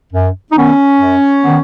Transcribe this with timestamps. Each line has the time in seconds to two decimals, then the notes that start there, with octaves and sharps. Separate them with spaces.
0.13 F#2
0.51 D#4
0.56 D#3 B3 C#4
0.99 F#2
1.42 D#3 B3